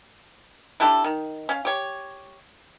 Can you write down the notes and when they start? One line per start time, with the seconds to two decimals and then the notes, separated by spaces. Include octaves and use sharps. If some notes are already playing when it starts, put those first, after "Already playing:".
0.80 D4 E4 G4 A4
1.04 D#3
1.49 C#4 F5
1.65 G4 C#5